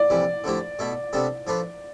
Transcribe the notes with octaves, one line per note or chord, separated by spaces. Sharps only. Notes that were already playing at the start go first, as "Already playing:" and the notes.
Already playing: D5
F2 C3 E3 G3
D3 F3 A3 E4 G4
B2 A3 E4 A4
C3 G3 B3 D4 A4
F3 A3 D4 F4 B4